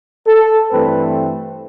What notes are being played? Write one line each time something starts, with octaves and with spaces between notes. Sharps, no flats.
A4
G2 E3 A3 C4 B4